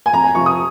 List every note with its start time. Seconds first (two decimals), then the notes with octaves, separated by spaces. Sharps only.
0.06 G#5
0.13 F2 A#5
0.24 G#5
0.35 C3 F3 C#6
0.46 D#6